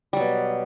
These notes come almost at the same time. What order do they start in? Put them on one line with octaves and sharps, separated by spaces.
G3 F#3 B2